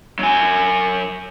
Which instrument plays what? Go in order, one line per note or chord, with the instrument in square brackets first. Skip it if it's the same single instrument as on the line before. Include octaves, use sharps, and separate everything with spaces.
[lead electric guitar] F#3 G#5